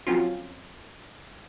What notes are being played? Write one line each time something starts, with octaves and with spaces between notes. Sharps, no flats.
F3 F#3 C4 C#4 F4